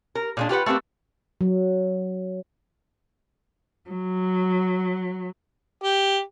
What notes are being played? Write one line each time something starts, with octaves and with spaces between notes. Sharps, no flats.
A#4
A#2 G#3 D4
F4 G4 B4 F#5
A3 A#3 C4 G4 B4
F#3
F#3
G4